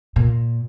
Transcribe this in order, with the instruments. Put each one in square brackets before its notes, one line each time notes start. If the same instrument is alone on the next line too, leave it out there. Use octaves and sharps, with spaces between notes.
[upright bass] A#2